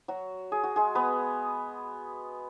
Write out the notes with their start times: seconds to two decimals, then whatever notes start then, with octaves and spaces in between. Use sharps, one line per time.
0.08 F#3 F#4
0.52 G#4
0.64 F#4
0.76 G#3 G#4
0.95 B3 B4